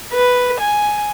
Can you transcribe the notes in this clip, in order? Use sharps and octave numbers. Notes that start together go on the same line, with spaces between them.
B4
G#5